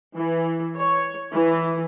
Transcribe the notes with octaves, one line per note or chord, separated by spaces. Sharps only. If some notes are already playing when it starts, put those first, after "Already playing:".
E3
C#5
E3